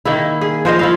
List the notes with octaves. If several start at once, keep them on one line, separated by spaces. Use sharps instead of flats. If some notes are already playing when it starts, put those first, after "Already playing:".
D#3 A#3 E4
G#4
F3 C5 D#5 F5
F3 E4 F5